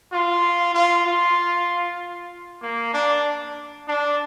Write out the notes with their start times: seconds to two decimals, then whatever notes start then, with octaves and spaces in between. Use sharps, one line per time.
0.13 F4
0.74 F4
1.06 F4
2.62 A#3
2.93 D4
3.88 D4